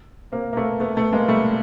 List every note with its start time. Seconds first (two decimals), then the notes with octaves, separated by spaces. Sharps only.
0.32 A#3 C4
0.53 A#3
0.56 A3 B3
0.80 A3 B3
0.96 A3 B3
1.13 G#3 A#3
1.28 G3 A3